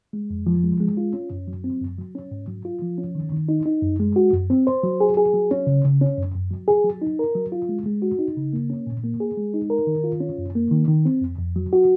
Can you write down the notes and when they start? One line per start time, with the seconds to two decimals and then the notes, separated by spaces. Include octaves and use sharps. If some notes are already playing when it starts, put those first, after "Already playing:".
0.13 G#3
0.30 F2
0.47 F3
0.63 G#3
0.80 G#3
0.97 F4
1.14 C#4
1.31 F#2
1.48 F#3
1.64 C4
1.81 F#2
1.98 F#3
2.15 C#4
2.31 G#2
2.48 F#3
2.65 F4
2.82 F3
2.98 C#4
3.15 D#3
3.32 D#3
3.49 D#4
3.66 D#4
3.82 F#2
4.00 G#3
4.16 F#4
4.33 F#2
4.50 C4
4.67 C5
4.83 F#3
5.01 G#4
5.17 G#4
5.34 F#3
5.51 C#4
5.67 C#3
5.85 C#3
6.01 C#4
6.18 F#2
6.35 F#2
6.51 F#3
6.68 G#4
6.84 F#3
7.02 D#4
7.19 A#4
7.35 F#3
7.52 F4
7.69 G#3
7.86 G#3
8.02 F#4
8.19 D#4
8.37 C#3
8.53 A#3
8.70 C#4
8.87 A#2
9.04 A#3
9.20 G#4
9.37 G#3
9.54 D#4
9.70 A#4
9.87 D#3
10.04 F4
10.20 C#4
10.38 F#2
10.55 A#3
10.71 D#3
10.88 D#3
11.05 C4
11.21 F2
11.38 F2
11.56 F#3
11.73 F#4